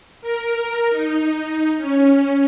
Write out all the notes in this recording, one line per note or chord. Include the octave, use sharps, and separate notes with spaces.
A#4
D#4
C#4